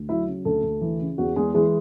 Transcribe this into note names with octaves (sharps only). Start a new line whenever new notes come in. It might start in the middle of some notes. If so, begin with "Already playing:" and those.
Already playing: D2
F#3 E4 E5
C#3
D2 A3 A4
D2
E3
C#3
E2 F#4
E2 G#3 G#4
E3 G#3 G#4